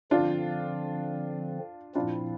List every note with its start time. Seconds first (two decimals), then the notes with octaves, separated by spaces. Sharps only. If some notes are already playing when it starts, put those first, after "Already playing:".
0.11 D3 F3 C4 D4 F4
1.95 A#2 F3 C4 D4 E4 F4